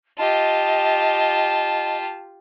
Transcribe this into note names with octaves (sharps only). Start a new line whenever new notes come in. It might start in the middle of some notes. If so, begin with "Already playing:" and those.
F4 G4 D#5 A5